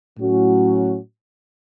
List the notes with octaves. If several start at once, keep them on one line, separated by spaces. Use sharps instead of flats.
A2 F#3 C#4 F#4